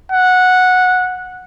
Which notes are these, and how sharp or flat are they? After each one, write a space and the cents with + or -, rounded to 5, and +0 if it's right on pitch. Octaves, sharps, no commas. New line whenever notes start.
F#5 -10